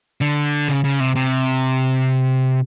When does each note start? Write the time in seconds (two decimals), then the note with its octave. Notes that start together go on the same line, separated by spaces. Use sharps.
0.21 D3
0.68 C#3
0.84 C#3
1.00 C3
1.16 C3